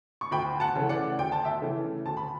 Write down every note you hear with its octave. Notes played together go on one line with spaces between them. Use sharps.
C#6
D2 G5 B5
F#5 A5
C#3 E3 A3
D5 F#5
D2 G5
A5
E5 G5
C#3 E3 A3
D2 A5
B5